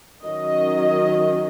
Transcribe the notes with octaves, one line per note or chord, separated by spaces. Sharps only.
D#3 F#3 C#4 D#5